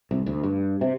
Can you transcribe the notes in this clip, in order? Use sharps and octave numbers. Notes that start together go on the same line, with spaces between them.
C2
D2
G2
C3